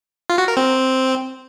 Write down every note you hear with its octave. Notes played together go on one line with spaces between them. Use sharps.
F4
F#4
A#4
C4